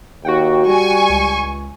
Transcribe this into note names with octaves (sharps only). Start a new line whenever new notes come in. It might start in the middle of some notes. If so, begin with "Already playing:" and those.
D#2 F#4 F#5 G5
G3 G#5 C#6
C#2